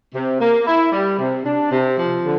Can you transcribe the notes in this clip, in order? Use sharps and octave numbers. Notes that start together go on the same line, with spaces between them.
C3
A#3
E4
G3
C3
D4
C3
F3
D3